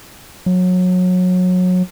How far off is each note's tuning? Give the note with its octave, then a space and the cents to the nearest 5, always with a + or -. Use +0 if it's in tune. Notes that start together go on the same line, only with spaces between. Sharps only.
F#3 -25